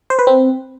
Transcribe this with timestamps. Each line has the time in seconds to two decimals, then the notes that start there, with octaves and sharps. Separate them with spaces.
0.10 C5
0.19 B4
0.27 C4